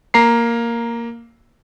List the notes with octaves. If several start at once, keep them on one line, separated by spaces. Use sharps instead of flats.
A#3 A#5 C7